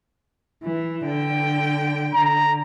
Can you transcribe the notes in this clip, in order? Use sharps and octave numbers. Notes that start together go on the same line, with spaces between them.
E3
D3 G5
D3 A#5